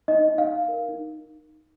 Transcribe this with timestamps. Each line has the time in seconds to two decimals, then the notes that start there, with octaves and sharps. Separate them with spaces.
0.08 D#4 D#5
0.28 D#4
0.38 F5
0.48 D#4
0.68 A#4
0.89 D#4